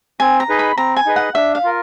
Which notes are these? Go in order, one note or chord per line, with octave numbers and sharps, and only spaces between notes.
C4 G#5
A#5
D#4 G#4 B4 D#5
B5
C4 A#5
G#5
D#4 G#4 B4 D#5
F#5
D4 E5
F5
F4 A#4